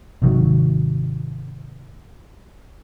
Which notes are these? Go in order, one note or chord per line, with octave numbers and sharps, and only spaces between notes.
G#1 C3 D#3 F#3